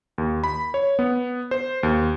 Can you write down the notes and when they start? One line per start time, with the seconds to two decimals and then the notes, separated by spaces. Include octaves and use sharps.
0.18 D#2
0.44 B5
0.74 C#5
0.99 B3
1.51 C5
1.83 D#2